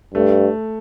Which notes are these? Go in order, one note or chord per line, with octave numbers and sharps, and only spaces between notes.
G2 A3